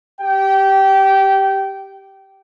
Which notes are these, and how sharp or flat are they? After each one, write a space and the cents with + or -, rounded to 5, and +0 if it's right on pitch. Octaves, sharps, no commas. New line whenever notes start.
G4 +0 G5 -20